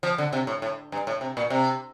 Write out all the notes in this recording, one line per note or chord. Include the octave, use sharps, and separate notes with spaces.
F3
D3
C3
A2
A2
G2
A2
C3
A#2
C3